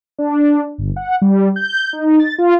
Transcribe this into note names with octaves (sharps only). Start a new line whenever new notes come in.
D4
G1
F#5
G3
G6
D#4
A6
F4